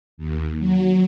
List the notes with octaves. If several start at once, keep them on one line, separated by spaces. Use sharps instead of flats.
D#2
F#3